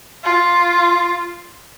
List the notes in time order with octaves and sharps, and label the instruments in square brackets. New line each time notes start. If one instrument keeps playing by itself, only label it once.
[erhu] F4